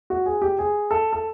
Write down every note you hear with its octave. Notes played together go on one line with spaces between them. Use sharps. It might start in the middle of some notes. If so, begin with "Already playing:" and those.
F#4
G#4
G4
G#4
A4
A4